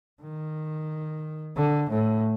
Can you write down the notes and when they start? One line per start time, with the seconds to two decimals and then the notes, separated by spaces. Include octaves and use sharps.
0.22 D#3
1.56 D3
1.90 A2